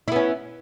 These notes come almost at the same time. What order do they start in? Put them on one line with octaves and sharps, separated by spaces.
E4 B3 C#4